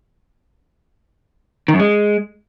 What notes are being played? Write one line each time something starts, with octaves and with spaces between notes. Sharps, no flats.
D#3
F#2
G#3